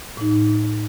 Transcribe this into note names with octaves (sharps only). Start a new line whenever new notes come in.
A2 D#4